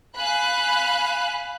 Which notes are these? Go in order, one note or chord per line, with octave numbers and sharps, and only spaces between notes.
F5 G#5 B5 F#6